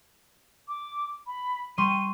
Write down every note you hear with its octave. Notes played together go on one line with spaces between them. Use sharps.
D6
B5
G3 C6 C#6 D#7